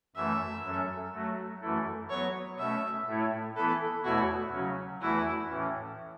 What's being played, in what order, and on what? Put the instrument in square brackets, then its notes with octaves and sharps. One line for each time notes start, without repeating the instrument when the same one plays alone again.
[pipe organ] F#2 E3 A3 [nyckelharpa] E5
[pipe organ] F#2 F#3 C#4 A4
F#3 A3 F#4
F#2 E3 A3 E4 A4
[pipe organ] F#3 B3 F#4 [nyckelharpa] C#5
[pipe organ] B2 A3 C#4 [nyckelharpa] E5
[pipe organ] A2 A3 E4 C#5
[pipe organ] E3 B3 E4 B4 [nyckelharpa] A4
[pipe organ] E2 B2 A3 E4 C#5 [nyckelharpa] F#4
[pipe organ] C#3 F#3 C#4
[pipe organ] E2 E3 A3 F#4 B4 [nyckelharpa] E4
[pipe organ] A2 E3 C#4